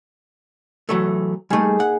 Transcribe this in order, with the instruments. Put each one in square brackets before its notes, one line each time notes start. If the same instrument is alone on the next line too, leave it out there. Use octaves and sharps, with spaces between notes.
[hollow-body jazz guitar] E3 F#3 A3
[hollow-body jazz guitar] G3 A3 [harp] A#3 D#4 G#4
[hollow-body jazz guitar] F#5